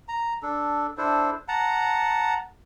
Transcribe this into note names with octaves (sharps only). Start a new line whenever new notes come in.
A#5
D4 A4
D4 E4 A4 C5
F#5 A5 A#5